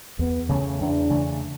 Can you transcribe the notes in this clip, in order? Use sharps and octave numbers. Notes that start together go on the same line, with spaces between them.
E2 B3
C#3 E3 A3 C#4
E2 D4
C#3 E3 A3